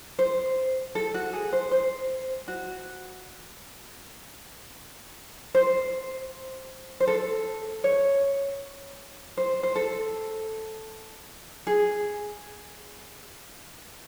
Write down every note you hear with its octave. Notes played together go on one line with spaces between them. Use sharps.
C5
A4
F#4
G#4
C5
C5
F#4
C5
C5
A4
C#5
C5
C5
A4
G#4